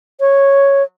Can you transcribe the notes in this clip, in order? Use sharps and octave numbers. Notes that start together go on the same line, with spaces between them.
C#5